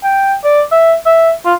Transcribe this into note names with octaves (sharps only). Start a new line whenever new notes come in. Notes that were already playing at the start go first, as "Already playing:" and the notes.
G5
D5
E5
E5
F4